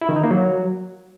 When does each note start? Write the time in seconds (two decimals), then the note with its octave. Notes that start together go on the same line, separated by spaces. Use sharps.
0.01 E4
0.09 D#3
0.16 D#4
0.24 A#3
0.31 F#3